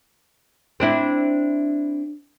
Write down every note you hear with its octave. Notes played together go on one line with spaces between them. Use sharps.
C4 D4 E4